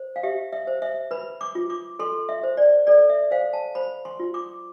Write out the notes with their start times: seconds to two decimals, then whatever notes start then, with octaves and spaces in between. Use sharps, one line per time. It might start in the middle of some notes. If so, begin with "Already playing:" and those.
Already playing: C5
0.16 F5
0.23 G4 E5
0.53 E5
0.67 C5
0.82 E5
1.11 B4 B5
1.41 D6
1.55 F4
1.70 D6
1.99 A4 C6
2.29 E5
2.43 C5
2.57 D5
2.87 A4 D5
3.10 E5
3.31 C5 F5
3.53 A5
3.75 C5 B5
4.05 C6
4.20 F4
4.34 D6